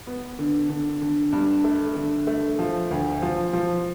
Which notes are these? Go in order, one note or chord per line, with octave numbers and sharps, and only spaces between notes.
B3
D3
D3
D3
G2
A3
D3
A3
F3
D2
F3
F3